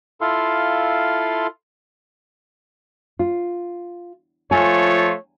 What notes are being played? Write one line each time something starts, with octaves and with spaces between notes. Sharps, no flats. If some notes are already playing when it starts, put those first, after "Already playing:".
E4 F4 A4 F5 C6
F4
F3 A3 F4 C#5 G#5